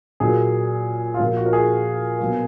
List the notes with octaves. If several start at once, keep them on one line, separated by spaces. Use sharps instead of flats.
A#2 F#3 A#3 G#4
F4
A#2 F3 A#3 F#4
F#4
A#4
G#4
B2 F#3 A#3